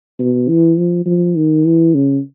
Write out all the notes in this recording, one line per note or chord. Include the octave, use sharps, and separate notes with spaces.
B2
E3
F3
F3
D#3
E3
C#3